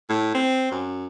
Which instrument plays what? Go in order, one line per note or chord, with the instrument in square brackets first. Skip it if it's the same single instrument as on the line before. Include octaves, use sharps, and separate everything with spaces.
[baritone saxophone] A2
C4
F#2